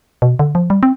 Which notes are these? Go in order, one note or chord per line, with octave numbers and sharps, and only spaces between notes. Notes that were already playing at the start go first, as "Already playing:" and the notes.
B2
D3
F3
G3
C4